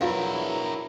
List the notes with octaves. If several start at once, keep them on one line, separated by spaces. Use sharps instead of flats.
E2 F#3 D4 E4 F4 A#4 F5